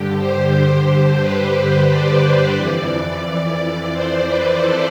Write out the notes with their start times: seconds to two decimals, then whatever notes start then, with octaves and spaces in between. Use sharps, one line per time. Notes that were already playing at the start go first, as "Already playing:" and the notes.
Already playing: G2 D3 G4
0.18 C5
0.51 C5
1.20 B4
1.88 D5
2.56 F2 E3
3.92 C5
4.26 B4
4.59 A4